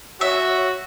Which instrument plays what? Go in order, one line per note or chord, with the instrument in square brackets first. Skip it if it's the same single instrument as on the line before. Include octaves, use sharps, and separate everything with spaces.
[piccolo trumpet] F#4 [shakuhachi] C#5 [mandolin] E5